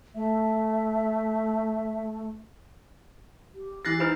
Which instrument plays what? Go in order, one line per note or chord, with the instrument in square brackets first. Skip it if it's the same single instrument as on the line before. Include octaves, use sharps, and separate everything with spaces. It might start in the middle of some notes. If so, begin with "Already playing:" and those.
[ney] A3 [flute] E5
[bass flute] G4
[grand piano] E3 A#6 [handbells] F#6 A6 C7
[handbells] D#4 E4 C5 [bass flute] B4 [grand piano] A#5 F6